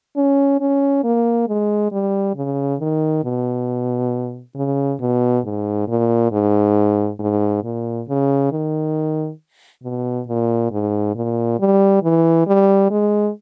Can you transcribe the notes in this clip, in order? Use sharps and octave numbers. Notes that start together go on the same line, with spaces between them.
C#4
C#4
A#3
G#3
G3
C#3
D#3
B2
C#3
B2
G#2
A#2
G#2
G#2
A#2
C#3
D#3
B2
A#2
G#2
A#2
G3
E3
G3
G#3